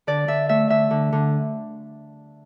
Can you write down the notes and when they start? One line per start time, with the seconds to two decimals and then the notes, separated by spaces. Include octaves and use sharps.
0.07 D3 D5
0.27 D3 E5
0.49 A3 E5
0.70 D3 E5
0.91 D3
1.12 D3